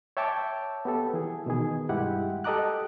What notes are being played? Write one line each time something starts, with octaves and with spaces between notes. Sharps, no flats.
C#5 E5 G5 A5 C#6 D6
B3 G4 A4
E3 G#4
B2 D#3 G#4
G2 G#3 E4 G4 F#5
G4 A4 D#5 A#5 D6 F#6